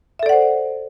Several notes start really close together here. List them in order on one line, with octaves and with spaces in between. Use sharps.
E5 A4 D5 F#5 C5